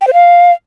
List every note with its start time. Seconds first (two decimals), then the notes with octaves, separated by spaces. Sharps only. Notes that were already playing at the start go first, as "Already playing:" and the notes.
0.01 G5
0.07 C5
0.13 F5